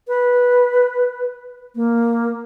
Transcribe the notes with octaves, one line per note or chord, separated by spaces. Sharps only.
B4
A#3